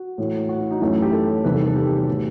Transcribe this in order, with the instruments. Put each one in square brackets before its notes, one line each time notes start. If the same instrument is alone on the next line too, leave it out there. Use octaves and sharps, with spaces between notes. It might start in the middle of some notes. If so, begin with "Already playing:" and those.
Already playing: [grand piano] F#4
A2 E3 A3
F#4
E4
D#4
F#2 E3 A3
G4
A4
E2 C3 D#3 G3 B4
A4
A4
G4
G4
F#4
A2 E3 A3